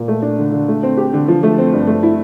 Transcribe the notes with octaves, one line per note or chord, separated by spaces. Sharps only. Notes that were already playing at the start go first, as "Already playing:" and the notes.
Already playing: A#2
A3
D4
D3
D3
A3
C4
G4
D3
F3
A3
C4
G2
A3
E4